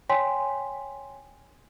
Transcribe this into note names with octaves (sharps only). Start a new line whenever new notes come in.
C#5 G5 G#5 C6 B6